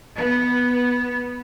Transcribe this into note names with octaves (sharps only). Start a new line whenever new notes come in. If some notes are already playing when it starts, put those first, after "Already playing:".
B3